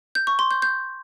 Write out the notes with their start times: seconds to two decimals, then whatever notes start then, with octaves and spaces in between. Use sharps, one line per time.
0.15 G6
0.27 C#6
0.39 C6
0.51 G6
0.62 G6